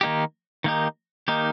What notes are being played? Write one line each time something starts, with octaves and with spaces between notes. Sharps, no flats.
D#3 A#3 D#4 G4
D#3 A#3 D#4 G4
D#3 A#3 D#4 G4